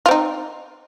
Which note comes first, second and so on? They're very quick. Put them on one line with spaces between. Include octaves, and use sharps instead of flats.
F4 C4 D#4